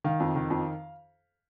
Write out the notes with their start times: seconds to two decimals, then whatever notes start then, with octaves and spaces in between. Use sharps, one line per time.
0.04 D#3 F5
0.20 F2
0.36 D#3
0.50 F2